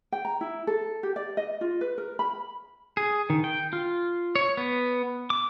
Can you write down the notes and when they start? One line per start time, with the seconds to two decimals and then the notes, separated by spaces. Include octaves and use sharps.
0.12 G5
0.25 A#5
0.41 E4
0.67 A4
1.03 G4
1.16 D5
1.37 D#5
1.61 F4
1.81 B4
1.98 A#4
2.19 B5
2.97 G#4
3.30 D#3
3.44 G5
3.73 F4
4.36 C#5
4.57 B3
5.30 D6